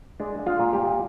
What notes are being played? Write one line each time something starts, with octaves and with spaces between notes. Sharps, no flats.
G#3 D4
G#3
F4
A#2
G4
A#2